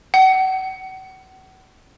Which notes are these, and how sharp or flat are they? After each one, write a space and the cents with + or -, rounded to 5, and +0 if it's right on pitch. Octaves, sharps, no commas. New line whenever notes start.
F#5 +35